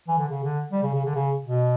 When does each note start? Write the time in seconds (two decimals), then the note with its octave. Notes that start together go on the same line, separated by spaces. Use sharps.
0.08 E3
0.18 D3
0.29 C#3
0.44 D3
0.72 G3
0.83 C#3
0.94 C#3
1.05 D3
1.15 C#3
1.45 B2